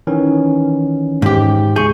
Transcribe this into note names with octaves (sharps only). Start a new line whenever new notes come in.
D#3 E3 C#4
G#2 G4
C#2 G#4 C#6 G6